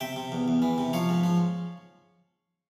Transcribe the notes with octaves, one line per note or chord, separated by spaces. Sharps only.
C3 E5 G5
C3
E2
E2
E3
C3
F3 C#5 F5
G#2
F3